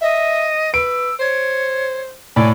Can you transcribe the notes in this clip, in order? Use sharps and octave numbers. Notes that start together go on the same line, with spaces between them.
D#5 E5
B4 E6 D7
C5 C#5
A2 D5 G#5